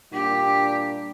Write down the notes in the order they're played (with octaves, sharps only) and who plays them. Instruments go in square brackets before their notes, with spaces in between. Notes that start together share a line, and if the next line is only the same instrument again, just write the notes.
[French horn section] A#2 G3 D4 [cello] G4